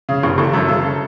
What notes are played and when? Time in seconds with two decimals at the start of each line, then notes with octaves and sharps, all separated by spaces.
0.09 C#3
0.23 F#1
0.38 F#1 A4
0.53 F#2
0.68 C#3 A4